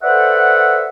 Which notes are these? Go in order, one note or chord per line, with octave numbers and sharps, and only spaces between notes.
A4 B4 C5 D5 E5 F#5